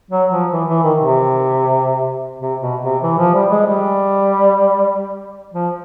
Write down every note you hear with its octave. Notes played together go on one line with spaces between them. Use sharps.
F#3
F3
E3
E3
D#3
C3
C3
B2
C3
E3
F3
G3
G#3
G3
F3